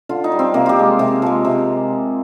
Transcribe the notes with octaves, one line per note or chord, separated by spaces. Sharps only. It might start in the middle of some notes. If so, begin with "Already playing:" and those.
D3 F4
D#4
G3
C4
C3 A#3
F4 G4
F3 G#3
C3
F3 G#3
C3